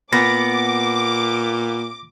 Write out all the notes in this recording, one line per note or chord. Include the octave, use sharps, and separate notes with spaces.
A#2 B3 D6 A#6